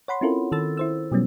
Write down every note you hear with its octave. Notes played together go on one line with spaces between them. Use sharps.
C#5 F#5 B5 C6
C4 C#4 E4 F4 A4 A#4
D#3 A4 E6 A6
E4 C5 E6
B2 F#3 G3 B3 C#4